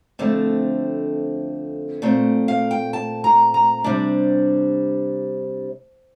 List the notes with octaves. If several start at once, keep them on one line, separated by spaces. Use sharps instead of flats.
F2 D3 A3 C4
A#2 A3 C4
F5
G5
A5
A#5
A#5
C3 G3 D4 C5